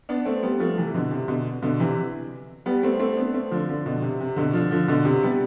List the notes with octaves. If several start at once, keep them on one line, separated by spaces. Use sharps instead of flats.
B3 D4
A3 C4
G3 B3
F3 A3
C3 E3
B2 D3
C3
B2 D3
B2 D3
C3 E3
G3 B3
A3 C4
A3 C4
B3 D4
A3 C4
D3 F3
D3 F3
B2 D3
C3
C3
B2 D3
D3 F3
D3 F3
B2 D3
C3
G3 B3